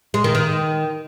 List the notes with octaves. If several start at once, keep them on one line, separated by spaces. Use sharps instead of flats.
G#3
D#3
D#3